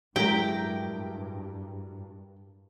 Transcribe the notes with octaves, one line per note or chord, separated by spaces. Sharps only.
G2 F#3 G#3 E4 G4 A#4 G5